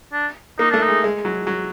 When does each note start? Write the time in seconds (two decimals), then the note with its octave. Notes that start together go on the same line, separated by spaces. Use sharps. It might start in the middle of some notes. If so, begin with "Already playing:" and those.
0.13 D4
0.59 A#3 D#4
0.71 A3 D4
0.82 D#4
0.89 G#3
1.04 G#3
1.25 F#3
1.47 F#3